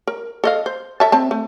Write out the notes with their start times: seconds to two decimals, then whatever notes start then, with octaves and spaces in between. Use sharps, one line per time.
0.07 A#4
0.44 A4 D#5 F5
0.66 C5
1.00 A4 E5 A5
1.12 C4 A5
1.31 A3